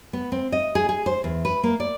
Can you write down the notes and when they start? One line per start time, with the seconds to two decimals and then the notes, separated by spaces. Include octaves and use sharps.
0.13 B3
0.32 C4
0.52 D#5
0.75 G#4
0.89 G#4
1.06 C5
1.24 E2
1.45 B4
1.63 A#3
1.80 D5